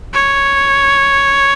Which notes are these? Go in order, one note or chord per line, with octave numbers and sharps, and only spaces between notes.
C#5